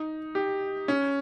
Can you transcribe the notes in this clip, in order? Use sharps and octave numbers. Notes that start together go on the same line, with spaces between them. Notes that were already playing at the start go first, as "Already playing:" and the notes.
Already playing: D#4
G4
C#4